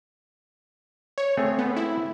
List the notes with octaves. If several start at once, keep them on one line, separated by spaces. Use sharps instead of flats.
C#5
A3 C4 G#4
B3
E4